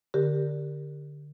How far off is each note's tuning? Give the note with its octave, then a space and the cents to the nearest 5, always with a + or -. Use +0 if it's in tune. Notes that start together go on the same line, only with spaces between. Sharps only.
D3 +0 G4 +5 A#4 +0